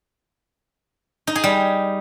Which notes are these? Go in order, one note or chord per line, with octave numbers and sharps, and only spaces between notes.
D#4
G#4
G3